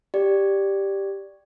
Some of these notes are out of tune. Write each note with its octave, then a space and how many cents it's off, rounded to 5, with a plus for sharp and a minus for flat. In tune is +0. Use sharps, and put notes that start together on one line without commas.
G4 +0 D5 +0